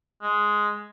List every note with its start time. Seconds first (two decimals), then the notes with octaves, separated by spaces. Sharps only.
0.22 G#3